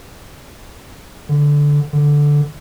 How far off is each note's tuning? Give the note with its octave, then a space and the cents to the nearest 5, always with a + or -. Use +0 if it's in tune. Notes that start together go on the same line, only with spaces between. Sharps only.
D3 -10
D3 -5